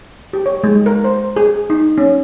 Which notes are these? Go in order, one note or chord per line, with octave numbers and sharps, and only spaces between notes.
G4
C#5
G#3
A#4
C5
G#4
D#4
C#4